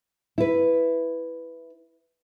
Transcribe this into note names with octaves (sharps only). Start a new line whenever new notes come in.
E4 B4